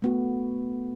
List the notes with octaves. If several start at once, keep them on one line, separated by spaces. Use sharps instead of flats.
A3 B3 F#4